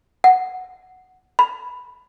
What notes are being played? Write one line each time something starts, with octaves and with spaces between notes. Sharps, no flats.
F#5
B5